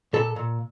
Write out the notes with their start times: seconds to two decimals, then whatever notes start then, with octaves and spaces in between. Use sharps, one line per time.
0.13 A#2 A4
0.36 A#2